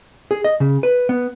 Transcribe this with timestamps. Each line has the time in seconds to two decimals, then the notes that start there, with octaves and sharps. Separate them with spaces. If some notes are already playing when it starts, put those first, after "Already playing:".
0.31 G#4
0.44 D#5
0.60 C#3
0.83 B4
1.09 B3